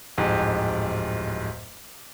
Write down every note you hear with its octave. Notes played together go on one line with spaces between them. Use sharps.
D1 F2 G#2 G4